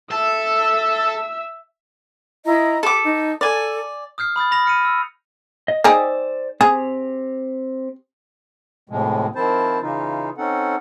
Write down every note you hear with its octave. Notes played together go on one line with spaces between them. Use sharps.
A4 E5 E6
E4 D#5 A#5
G4 A4 D6
D#4
A4 D5 G#5
D#6 F6 G6 C7
B5 D#6 G6 A6
B5 D#6 A#6 F7
F6 C#7 D#7
E6
D#5
D#4 G4 G#4 C5 D5 E6
C4 G4 G#4
D#2 A2 C3 F3 G#3
D#3 F3 C4 E4 C5 A5
C#3 E3 D#4 F4
C4 C#4 D#4 A4 F#5